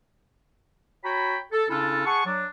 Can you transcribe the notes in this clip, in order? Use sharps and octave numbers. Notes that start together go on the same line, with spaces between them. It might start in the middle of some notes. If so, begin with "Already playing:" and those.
F#4 C#5 G5 A#5 B5
A4
C#3 C#4 D4 E4 F4 A4
G#4 F#5 G#5 A5 C#6
F#3 D4